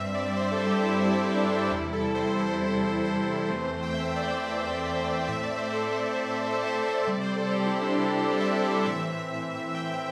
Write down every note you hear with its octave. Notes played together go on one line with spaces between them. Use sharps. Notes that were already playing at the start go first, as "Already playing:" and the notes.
Already playing: G2 G3 C4 E5
D5
C5
A4
G4
E4
E4
E4
D4
D4
E2 C3 G3 E4
A4
C5
A4
C5
C5
E2 E3 A3 C4
G5
E5
D5
A2 A3 C4 E5
D5
C5
A4
A4
C5
C3 G3 C4 D5
C5
A4
G4
E4
D4
E4
E4
G4
A4
E5
D5
A2 E3 C4 E5
G5